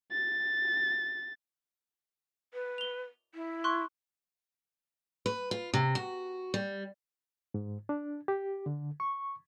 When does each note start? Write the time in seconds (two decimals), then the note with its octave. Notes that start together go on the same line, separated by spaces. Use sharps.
0.12 A6
2.54 B4
2.78 F7 G7
3.34 E4
3.64 C6 C#6 F#6
5.26 B4
5.51 F4
5.74 C3
5.95 F#4
6.54 G3
7.54 G#2
7.89 D4
8.28 G4
8.66 D3
9.00 C#6